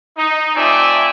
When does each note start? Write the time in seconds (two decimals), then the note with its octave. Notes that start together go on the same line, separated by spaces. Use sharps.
0.17 D#4
0.55 A3 C4 F4 D5 E5 G#5